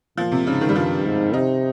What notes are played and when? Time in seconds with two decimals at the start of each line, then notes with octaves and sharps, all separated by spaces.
0.18 A#2 F3
0.32 C3
0.47 G#2 C#3
0.61 D#3
0.69 G3
0.76 G2 F3
1.05 G#2
1.33 C3 D#4